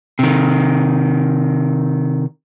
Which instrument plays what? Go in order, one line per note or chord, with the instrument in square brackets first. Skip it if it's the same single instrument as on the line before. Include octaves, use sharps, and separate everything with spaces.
[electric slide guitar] C3 D#3